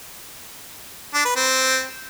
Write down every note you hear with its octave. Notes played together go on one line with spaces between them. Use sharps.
D4
B4
C4